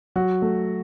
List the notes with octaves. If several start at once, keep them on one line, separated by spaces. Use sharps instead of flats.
F#3 F#4
A3